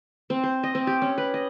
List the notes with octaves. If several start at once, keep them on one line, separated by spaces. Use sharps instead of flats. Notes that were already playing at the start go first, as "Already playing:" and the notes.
C4
C5
D#5
C4
G4
C#4
B4
D#5